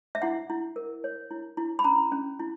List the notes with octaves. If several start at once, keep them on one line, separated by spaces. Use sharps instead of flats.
E5
E4 F#5
E4
A#4
C#5
E4
E4
B5
C#4 A#5
C#4
E4